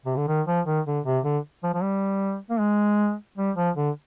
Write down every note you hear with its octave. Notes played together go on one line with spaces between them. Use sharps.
C3
D3
D#3
F3
D#3
D3
C3
D3
F3
F3
G3
A#3
G#3
G3
F3
D3